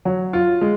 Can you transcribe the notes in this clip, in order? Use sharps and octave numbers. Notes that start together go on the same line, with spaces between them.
F#3
F4
G#3